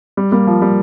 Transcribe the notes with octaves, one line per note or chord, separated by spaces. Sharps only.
G3
G3 A#3
F3
G3